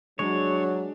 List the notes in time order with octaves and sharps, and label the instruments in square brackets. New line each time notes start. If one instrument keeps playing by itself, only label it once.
[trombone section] F#3 [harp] G#3 [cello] D4 [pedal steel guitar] C#5